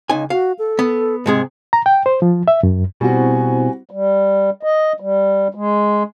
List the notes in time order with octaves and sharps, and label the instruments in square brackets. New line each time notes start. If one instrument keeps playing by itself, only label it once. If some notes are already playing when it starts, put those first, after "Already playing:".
[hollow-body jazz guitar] C#2 G#5 [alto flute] D#4
[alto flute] F#4 [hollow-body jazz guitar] F5
[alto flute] A4
[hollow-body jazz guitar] B3
[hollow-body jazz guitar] G#2 C3 G#4 [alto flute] G#3
[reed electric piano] A#5
G5
C5
F3
E5
F#2
[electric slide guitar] B2 [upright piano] G3 F#4 [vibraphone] C4 E4 C5 [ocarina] G#5
[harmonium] G3
D#5
G3
G#3